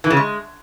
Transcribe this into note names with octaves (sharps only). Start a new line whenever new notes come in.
E3
C#3
G#3